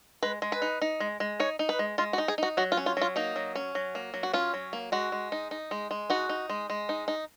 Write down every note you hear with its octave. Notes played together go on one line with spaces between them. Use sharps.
G#3 B4
G#3
B4
D#4
D#4
G#3
G#3
D#4 C#5
D#4
B4
G#3
G#3 F4
F#4
D#4
G#4
D#4 F#4
F#3 F#4
F4
C#4
F4
F#3 F4
A#3 D#4
F#3
C#4
F#3
A#3
F#3
F#4
C#4 F4
F#3
A#3
G#3 F#4
G#3
D#4
D#4
G#3
G#3
D#4 F#4
D#4
G#3
G#3
D#4
D#4